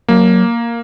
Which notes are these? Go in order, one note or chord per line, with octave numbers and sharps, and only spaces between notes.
F#3 A#3